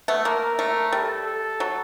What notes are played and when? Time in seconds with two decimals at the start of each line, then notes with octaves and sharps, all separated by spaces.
0.08 A3 B3
0.25 A#3 A#4
0.59 A3
0.92 G3 A4
1.26 A4
1.60 F#3